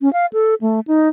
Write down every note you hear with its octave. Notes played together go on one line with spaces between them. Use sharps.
C#4
F5
A4
A3
D#4